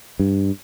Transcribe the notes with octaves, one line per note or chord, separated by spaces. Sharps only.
G2